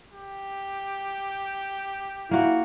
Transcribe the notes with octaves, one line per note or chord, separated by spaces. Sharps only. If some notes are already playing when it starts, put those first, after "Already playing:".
G4
A#3 E4 F#4